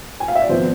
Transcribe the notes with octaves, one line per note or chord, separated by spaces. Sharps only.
G#5
F5
E5
D5
G#1 F3 B3 C5